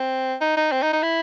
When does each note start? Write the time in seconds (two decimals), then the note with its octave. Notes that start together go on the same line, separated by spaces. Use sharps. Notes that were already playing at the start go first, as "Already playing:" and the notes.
Already playing: C4
0.41 D#4
0.57 D#4
0.72 C4
0.83 D#4
0.93 D#4
1.03 E4